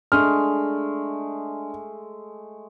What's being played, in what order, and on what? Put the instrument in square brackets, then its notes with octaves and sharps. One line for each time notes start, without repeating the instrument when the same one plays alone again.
[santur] G#3 A3 [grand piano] D4 F6